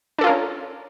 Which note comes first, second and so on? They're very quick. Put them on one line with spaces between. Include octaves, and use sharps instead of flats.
D4 A4 F4 A#4 C#4